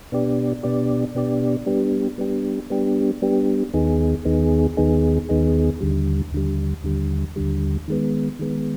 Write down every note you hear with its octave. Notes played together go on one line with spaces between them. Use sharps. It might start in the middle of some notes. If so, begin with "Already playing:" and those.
B2 B3 D4 G4 D5
B2 B3 D4 G4 D5
B2 B3 D4 G4 D5
G3 B3 D4 G4
G3 B3 D4 G4
G3 B3 D4 G4
G3 B3 D4 G4
D#2 D#3 B3 D#4 G#4
D#2 D#3 B3 D#4 G#4
D#2 D#3 B3 D#4 G#4
D#2 D#3 B3 D#4 G#4
D#2 D3 G3
D#2 D3 G3
D#2 D3 G3
D#2 D3 G3
D#3 G#3 B3
D#3 G#3 B3